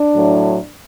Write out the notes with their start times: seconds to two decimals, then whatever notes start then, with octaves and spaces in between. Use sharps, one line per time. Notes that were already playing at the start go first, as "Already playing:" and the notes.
Already playing: D4
0.14 A2 F#3